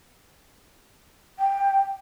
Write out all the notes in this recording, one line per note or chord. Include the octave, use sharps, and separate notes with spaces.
G5